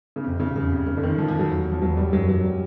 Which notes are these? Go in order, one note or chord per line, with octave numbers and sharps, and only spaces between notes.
C#3
F2 C3
C#3
E2 C#3
C3
F2 C#3
D3
D#3
F3
F3
F#3
E2
F3
E2 F#3
G3
F#2 F#3
F#3
G3